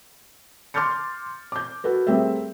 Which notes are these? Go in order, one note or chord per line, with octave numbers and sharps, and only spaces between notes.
C6 D6 F6 G6 A6 C#7
D6 G6
F#4 A4 B4
G3 A3 C4 G#4 A#4 E5